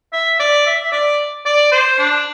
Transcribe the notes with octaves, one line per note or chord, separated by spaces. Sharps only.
E5
D5
E5
E5
D5
D5
C5
D4